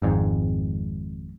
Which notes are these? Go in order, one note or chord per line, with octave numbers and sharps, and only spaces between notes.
G#1 F2 G#2